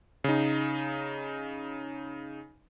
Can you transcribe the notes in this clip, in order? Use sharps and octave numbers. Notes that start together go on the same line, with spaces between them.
C#3 D#4